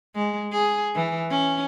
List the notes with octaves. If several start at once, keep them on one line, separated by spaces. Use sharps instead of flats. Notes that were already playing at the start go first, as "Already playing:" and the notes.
G#3
G#4
E3
C#4